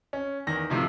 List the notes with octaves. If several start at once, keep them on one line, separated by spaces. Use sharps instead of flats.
C#4
E2 D#3 A#6
F2 A2 C3 D#3 F3